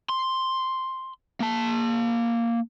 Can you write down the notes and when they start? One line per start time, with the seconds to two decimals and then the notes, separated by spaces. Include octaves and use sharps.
0.09 C6
1.40 A#3 A5